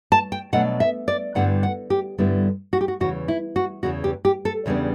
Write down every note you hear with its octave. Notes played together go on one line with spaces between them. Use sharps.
A5
G5
B2 F#3 A3 D4 F#5
E5
D5
G2 D3 G3 B3 E4 F#5
F#5
G4
G2 D3 G3 B3 E4
F#4
G4
F#4
E2 C#3 E3 F#4
E4
F#4
E2 C#3 E3 F#4
G4
G4
A4
E2 C#3 G3 B3 D4